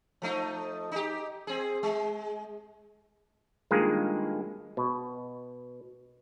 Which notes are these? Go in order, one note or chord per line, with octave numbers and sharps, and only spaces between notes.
F3 A3 D#4
D#4 G4
C4 G#4
G#3
G2 D#3 G#3 A#3 F4 G#4
B2